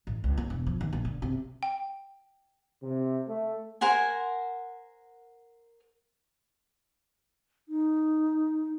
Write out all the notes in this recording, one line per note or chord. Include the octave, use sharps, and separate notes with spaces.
A1
C#2
A#3
E1
F3
D#2
A#1
D3
C3
G5
C3
A3
A#4 C5 F#5 G#5
D#4